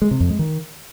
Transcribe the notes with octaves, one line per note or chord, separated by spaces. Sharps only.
G#3
C3
F2
G#3
D#3